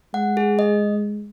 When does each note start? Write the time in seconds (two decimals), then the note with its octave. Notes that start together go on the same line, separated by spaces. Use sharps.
0.14 G#3 F#5
0.37 G#4
0.59 D#5